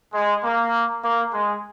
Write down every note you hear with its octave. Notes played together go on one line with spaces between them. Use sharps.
G#3
A#3
A#3
G#3